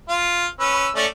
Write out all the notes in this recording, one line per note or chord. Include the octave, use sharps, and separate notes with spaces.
F4
C#4 B4 E6
A3 C#4 D5